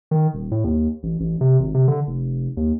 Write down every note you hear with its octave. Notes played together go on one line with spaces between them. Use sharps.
D#3
D#1
A2
D#2
A1
A1
C3
G#1
C3
D3
F1
D#2